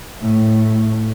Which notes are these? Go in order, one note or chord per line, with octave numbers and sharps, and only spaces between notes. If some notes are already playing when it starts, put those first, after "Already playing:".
A2 A3